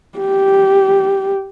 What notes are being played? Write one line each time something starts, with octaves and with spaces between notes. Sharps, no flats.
G4